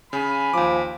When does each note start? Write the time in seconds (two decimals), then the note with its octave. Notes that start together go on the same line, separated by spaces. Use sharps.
0.13 C#3 G#5 B5
0.53 D#2 F3 D6